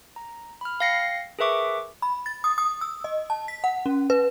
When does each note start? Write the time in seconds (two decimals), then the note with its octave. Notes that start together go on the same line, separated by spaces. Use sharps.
0.16 A#5
0.61 B5 F6
0.80 F5 G5 A#6 C7 C#7
1.39 G#4 A#4 B4 E5 C#6 D6
2.02 B5
2.26 A6
2.44 D#6
2.58 D#6
2.81 E6
3.04 D#5
3.30 A5
3.48 B6
3.64 F#5
3.86 C#4
4.10 B4